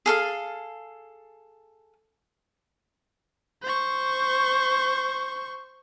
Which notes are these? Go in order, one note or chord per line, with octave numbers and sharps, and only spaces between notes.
G#4 A4 F5
C5 C#6